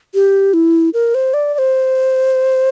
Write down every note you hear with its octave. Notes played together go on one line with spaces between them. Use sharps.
G4
E4
A#4
C5
D5
D5
C5